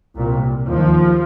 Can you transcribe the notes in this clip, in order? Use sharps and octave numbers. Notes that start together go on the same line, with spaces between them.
C2 A#2
D#2 F3